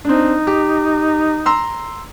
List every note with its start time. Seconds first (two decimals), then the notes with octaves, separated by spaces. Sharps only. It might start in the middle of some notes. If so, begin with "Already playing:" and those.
0.05 C4 D4 D#4
0.47 G4
1.46 A#5 C6 E6